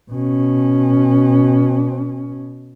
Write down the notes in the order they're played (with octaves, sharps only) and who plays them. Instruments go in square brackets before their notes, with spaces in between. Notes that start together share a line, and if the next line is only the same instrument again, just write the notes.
[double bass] B2 C#4